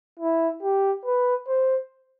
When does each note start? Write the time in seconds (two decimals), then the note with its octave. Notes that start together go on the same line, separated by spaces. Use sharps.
0.19 E4
0.62 G4
1.05 B4
1.48 C5